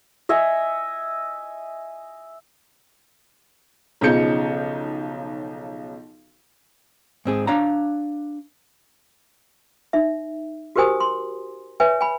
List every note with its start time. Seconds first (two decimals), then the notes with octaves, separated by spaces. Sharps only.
0.29 D#5 E5 G#5 C#6
4.01 B1 C#3 F3 D#4 G6 C#7
7.25 G#2 C4 G#4
7.47 D4 C#5 F5 A#5
9.93 D#4 E5
10.76 F#4 G4 A#4 C5 G#5 D#6
11.00 C6
11.80 B4 C#5 E5 G#5
12.01 G#5 B5